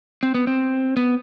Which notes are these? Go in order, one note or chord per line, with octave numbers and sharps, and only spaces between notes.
C4
B3
C4
B3